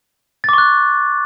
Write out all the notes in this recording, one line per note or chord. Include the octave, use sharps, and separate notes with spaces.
C#6 D6 F#6 A6